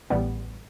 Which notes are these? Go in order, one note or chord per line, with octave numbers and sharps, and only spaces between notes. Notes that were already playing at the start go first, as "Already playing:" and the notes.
A1 A2 G3 B3